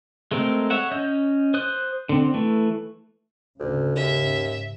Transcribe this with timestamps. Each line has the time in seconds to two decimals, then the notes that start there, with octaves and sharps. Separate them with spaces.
0.31 G#3 A3 C4 A#4
0.70 C#5 E5 F#5
0.91 C#4 D#5 G6
1.54 C5 D#6 F#6
2.09 D3 C4
2.34 E3 A3
3.60 D2 G#2 C#3
3.96 D#2 E5